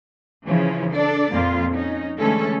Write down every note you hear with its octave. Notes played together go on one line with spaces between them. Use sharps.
C#3 E3 F3 C#4 E4
D4 A4 D5
F2 A#2 A#3 F4
C#4 D#4
D3 E3 G#3 A3 C#4 A4